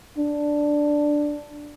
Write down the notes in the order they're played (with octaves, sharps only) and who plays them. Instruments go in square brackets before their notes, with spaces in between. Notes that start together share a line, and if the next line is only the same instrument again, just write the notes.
[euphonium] D4